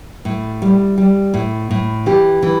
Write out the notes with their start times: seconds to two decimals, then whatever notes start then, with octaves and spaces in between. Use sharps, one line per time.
0.25 A2
0.62 G3
0.98 G3
1.34 A2
1.71 A2
2.06 E3 G4
2.42 E3